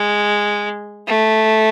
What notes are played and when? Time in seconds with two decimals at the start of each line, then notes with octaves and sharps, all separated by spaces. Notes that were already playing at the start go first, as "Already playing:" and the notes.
Already playing: G#3
1.07 A3